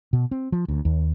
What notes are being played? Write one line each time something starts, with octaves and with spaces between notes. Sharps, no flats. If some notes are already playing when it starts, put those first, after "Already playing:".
B2
C4
F3
D2
D#2